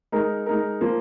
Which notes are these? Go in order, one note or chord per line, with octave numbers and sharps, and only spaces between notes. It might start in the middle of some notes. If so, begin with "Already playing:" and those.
G#3 D#4 A#4
G#3 D#4 A#4
F3 A#3 F4